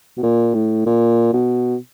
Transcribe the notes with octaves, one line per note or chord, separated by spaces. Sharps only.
B2
A#2
A2
A#2
B2